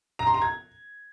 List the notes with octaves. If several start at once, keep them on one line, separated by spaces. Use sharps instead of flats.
A#5
C6
A#5
G#6